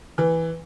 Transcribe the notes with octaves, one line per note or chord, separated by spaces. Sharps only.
E3